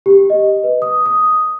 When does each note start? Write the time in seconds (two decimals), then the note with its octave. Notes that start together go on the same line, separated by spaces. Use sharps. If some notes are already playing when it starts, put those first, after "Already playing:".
0.06 G4
0.30 D#5
0.64 B4
0.82 D#6
1.06 D#6